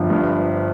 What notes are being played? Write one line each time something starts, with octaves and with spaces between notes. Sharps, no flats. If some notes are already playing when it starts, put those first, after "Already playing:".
Already playing: G1 F3
G2